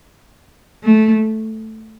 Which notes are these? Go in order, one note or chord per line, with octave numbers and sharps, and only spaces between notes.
A3